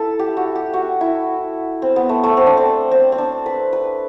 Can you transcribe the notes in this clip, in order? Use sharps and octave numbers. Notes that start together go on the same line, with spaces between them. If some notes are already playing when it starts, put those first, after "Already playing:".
Already playing: E4 A4
G4
F#4
G4
F#4
E4
C4
B3
A3
A3
C4
D4
C4
C4
C4
D4
B4
B4